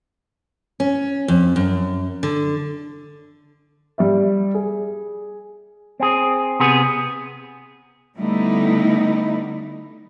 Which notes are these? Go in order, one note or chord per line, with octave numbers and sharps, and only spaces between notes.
C#4
F2
F#2
D3
G3 D5 E5
G#4
C4 G#4
C3 B3 G#4
D3 G3 A3 B3 D#4 E4